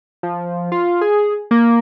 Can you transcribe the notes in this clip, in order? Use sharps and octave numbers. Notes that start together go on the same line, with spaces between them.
F3
F4
G#4
A#3